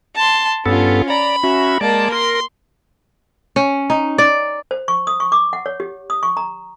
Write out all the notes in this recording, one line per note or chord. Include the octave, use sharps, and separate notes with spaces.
A5 C6
G2 B3 C#4 F4 A4
D5 A#5 B5
C#4 F#4 E5
G#3 A#3 D5 A5
A#4 C6
C#4
D#4
D5
C5
C#6
D#6
C#6
D6
F#5
C#5
G4
D#6
C#6
A#5